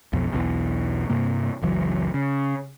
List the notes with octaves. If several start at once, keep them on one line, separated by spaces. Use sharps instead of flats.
B1 F2 B2
B1 E2 B2 E3
G2 C3 A#3
F#1 C#2 E3 F#3
C#3